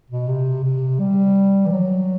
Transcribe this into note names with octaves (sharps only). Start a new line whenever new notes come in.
B2
C3
C3
G3
E3
F#3